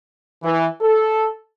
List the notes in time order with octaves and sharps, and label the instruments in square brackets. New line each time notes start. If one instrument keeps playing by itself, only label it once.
[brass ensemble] E3
A4